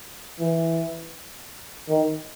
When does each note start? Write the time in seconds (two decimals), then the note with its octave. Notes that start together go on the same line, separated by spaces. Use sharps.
0.40 E3
1.88 D#3